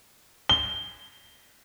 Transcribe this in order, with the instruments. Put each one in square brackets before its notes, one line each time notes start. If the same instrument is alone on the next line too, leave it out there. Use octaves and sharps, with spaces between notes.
[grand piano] G7